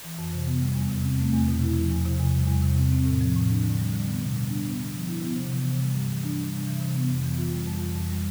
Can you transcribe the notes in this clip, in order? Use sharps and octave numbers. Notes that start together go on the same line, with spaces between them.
E3
F2
C3
B3
G3
E2
C3
C4
A3
E2
B2
E4
F3
E2
C3
E2
G3
E2
C3
C4
C4
A2
F3
A2
D4
D3
G3
D3
B3
B2
G3
D4
B3
D3
F3
E4
B3
C3
E3
C3
G3
G2
E3
D4
G3
C3
E3
C3
B3
F2
E3
F4
G3
F2
E3
F2
G3